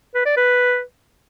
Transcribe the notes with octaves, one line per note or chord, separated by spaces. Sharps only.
B4
D5
B4